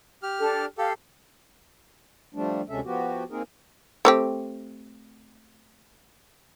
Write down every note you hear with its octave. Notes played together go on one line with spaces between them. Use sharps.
G4 F6
D4 A4
G4 A4 F5
F3 G3 A3 D4
D2 C3 G#3 C#4 A4 E5
F3 B3 F#4 G4
A#3 C4 D#4 G#4 A#4
A3 C4 G4